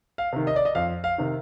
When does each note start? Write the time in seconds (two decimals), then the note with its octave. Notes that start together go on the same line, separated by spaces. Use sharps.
0.18 F5
0.33 C3 D#3
0.47 D#5
0.56 D5
0.65 D#5
0.75 F2 F5
1.04 F5
1.18 C3 D#3